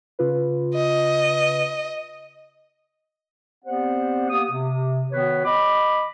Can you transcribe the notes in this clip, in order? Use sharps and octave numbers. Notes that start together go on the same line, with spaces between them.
C#3 F4 B4
D#5
B3 C4 G4 C5 D5 F#5
A#3 B3 G4 D#6
C3
D#3 B3 F#4 B4 C#5
D#5 B5 D6